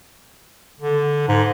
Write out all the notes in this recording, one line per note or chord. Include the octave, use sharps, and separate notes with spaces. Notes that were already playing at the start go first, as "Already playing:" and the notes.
D3
G#2